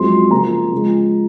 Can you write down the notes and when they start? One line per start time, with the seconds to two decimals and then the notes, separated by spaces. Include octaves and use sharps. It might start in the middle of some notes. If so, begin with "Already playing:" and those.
Already playing: F#2 F3 G#3 C4 C6
0.31 C#3 F3 A#3 A#5
0.72 C#3 F3 G#3